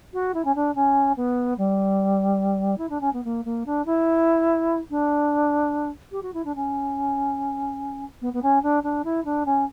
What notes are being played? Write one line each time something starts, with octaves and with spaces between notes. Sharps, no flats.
F#4
E4
C#4
D4
C#4
B3
G3
E4
D4
C#4
B3
A#3
A#3
D4
E4
D4
G4
F#4
E4
D4
C#4
B3
B3
C#4
D4
D4
E4
D4
C#4